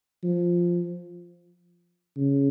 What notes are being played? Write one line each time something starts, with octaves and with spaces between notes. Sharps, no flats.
F3
C#3